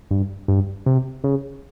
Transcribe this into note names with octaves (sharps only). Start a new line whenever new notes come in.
G2
G2
C3
C#3